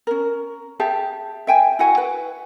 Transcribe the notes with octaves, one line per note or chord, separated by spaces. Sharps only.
C#4 A#4
G4 G#4 E5 A5
E5 G5 G#5
E4 F#4 F#5 G#5
B4